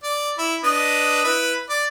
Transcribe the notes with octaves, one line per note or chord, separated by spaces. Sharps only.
D5
E4
D4 B4 D#5
E4 B4
D5